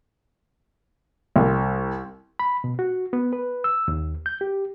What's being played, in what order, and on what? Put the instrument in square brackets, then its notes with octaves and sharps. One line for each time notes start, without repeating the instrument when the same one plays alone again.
[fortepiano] C2
[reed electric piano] B5
B2
F#4
B3
B4
E6
D#2
G6
G4